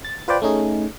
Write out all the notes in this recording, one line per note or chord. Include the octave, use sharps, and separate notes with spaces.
A6
F4 B4 C5 D5 G5
A3 C#4 D#4 G#4